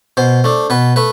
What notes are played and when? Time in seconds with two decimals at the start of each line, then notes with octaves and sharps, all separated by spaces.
0.17 B2 C5
0.44 A3 D4
0.70 B2 B4
0.96 A3 B4